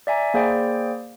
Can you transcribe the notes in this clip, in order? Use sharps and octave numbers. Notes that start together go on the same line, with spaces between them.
D5 E5 G#5 A#5
A#3 G#4 C5 D5 G5